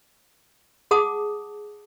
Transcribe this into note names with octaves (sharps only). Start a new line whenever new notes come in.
G#4 F#5 A5 D6 D#6